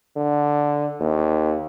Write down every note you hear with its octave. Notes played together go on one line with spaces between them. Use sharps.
D3
D#2